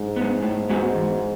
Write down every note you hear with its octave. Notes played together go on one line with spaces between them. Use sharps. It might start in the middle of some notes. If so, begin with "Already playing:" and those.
Already playing: G#2
G#3 B3
A2
G#3 B3 F#4
E2